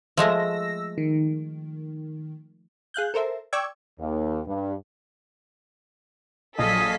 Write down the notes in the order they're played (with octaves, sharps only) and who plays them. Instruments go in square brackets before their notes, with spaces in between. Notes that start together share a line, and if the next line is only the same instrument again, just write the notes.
[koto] F3 G#3 A3 [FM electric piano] E6 A#6
[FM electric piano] D#3
[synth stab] G#4 F5 F#6 G6
A4 A#4 C5 E5
D5 G5 C#6 D6 E6 G#6
[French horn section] D#2
G2
[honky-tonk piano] A#1 [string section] F#3 A4 B6 [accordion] D#5 F5 G#5 [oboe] D#6